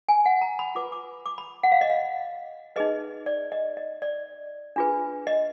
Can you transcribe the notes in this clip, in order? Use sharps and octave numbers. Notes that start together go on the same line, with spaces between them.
G#5
F#5
A#5
B5
F4 B4 D6
D6
D6
B5
F#5
F5
D#5
F5
D#4 G#4 B4 D#5
D5
D#5
D#5
D5
D4 F4 G#4 B4
D#5